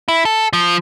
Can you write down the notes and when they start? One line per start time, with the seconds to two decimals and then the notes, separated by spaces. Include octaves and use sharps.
0.08 E4
0.25 A4
0.53 F3